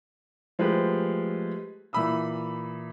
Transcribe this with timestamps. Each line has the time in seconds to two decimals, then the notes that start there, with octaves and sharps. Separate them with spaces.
0.59 F3 G#3 A3 G4 B4
1.93 A#2 E3 E5 B5 D#6 E6